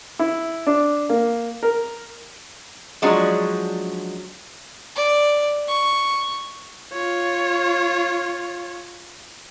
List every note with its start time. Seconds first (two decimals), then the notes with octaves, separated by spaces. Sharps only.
0.19 E4
0.67 D4
1.09 A#3
1.63 A#4
3.02 F3 F#3 G#3 C#4 D4
4.96 D5
5.68 C#6
6.93 F4 C#5